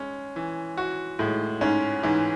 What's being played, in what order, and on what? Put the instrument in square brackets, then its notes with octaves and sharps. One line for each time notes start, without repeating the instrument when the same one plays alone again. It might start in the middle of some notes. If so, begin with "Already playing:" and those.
Already playing: [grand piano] G#3 C#4
E3
F#4
[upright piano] A2 [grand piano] G#3
[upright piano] G#2 [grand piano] C#4
[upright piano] G#2 [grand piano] E3